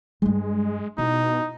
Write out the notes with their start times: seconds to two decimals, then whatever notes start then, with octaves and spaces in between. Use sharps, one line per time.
0.22 G2 G3 G#3
0.98 B2 D#4 E4